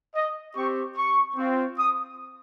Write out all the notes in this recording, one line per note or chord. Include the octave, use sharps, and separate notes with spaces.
D#5
C4 G4 C#6
C#6
C4 F4
D#6